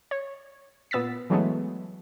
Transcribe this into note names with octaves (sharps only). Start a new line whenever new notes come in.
C#5
A#2 B3 E6 A6 B6
E3 F#3 G#3 A3 B3